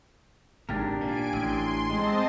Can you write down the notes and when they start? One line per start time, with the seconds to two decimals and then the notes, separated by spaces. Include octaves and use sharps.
0.69 G#1 G#2 D4 G4 A#4
1.01 A#2 G#5 D7
1.33 A1 C6
1.90 G#3 C4 D#5 A5